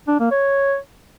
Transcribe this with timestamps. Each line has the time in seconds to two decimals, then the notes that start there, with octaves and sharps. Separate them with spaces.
0.08 D4
0.19 A#3
0.31 C#5